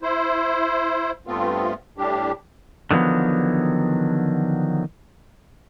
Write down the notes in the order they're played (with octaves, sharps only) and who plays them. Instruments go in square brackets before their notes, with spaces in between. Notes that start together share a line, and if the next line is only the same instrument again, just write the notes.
[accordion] E4 C5
G2 A3 B3 C4 F4
A2 G3 D4 G4
[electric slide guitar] D3 D#3 F3 F#3 B3